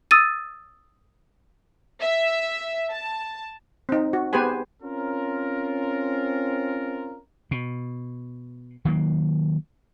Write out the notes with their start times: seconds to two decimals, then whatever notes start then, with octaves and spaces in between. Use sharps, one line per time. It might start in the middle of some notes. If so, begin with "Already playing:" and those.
0.11 D#6 E6 A6 D#7
2.02 E5
2.93 A5
3.89 C4 D#4
4.13 F#4
4.33 B3 G4 G#4 B4 C5 G#5
4.83 C4 C#4 F4 A#4
7.51 B2
8.85 D#3 F#3 A#3